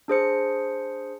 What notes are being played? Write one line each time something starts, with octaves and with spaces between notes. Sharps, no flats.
D4 G#4 C5 C#7